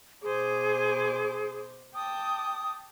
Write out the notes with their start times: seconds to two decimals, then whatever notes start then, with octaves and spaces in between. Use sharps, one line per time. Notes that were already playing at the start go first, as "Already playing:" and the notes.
0.22 B2 G#4 C5 D6
1.95 G5 A5 D6 D#6